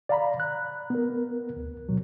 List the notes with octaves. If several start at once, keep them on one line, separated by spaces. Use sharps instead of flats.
D5 F5 A#5 B5
F#6
B3 A#4
D2
B2 F#3